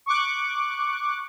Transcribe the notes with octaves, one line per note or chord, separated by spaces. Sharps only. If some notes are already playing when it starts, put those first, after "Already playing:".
C#6 D6 F#6